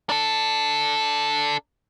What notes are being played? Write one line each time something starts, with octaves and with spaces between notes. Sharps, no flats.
D4 A4